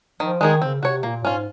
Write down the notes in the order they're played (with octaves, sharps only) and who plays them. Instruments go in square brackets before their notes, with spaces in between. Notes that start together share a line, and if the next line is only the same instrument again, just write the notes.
[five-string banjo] D#3 [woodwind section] F3
[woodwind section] D#3 [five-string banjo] G#3 D#4 G#4
[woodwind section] C#3 [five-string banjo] C4
[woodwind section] C3 [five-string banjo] F#4 C#5
[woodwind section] A#2 [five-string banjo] A#3
[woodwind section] G#2 [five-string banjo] C#4 F4